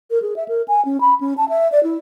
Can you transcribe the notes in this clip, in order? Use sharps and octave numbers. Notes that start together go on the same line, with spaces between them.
A#4
G#4
E5
A#4
G#5
C#4
B5
C#4
A5
E5
D5
E4